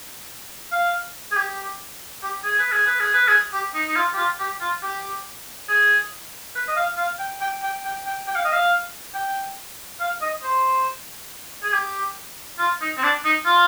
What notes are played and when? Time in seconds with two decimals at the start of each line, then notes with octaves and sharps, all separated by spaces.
0.72 F5
1.32 G#4
1.36 G4
2.23 G4
2.44 G#4
2.59 B4
2.72 G#4
2.87 B4
3.00 G#4
3.14 B4
3.28 G#4
3.53 G4
3.75 D#4
3.87 D#4
3.96 F4
4.14 G4
4.17 F4
4.40 G4
4.61 F4
4.83 G4
5.69 G#4
6.55 B4
6.68 D#5
6.77 F5
6.98 F5
7.19 G5
7.41 G5
7.63 G5
7.85 G5
8.07 G5
8.28 G5
8.36 F5
8.45 D#5
8.53 F5
9.14 G5
10.00 F5
10.22 D#5
10.44 C5
11.64 G#4
11.73 G4
12.59 F4
12.81 D#4
12.98 C4
13.03 D4
13.25 D#4
13.46 F4